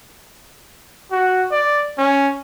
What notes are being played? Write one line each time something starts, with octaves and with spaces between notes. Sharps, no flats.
F#4
D5
C#4